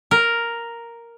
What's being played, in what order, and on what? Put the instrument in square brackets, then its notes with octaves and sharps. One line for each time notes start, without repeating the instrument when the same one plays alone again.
[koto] A#4